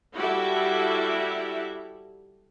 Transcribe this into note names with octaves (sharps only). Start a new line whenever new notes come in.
G3 E4 F#4 G4 A4 E5